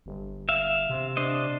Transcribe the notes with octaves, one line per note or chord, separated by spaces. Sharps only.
G1
E5 F5
C3
D4 C5 D#5